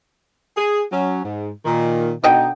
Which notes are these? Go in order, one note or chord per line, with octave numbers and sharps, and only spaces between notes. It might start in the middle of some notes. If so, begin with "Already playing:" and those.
G#4
F#3 C#4
G#2
A#2 D#3
B2 D3 D#4 D#5 G5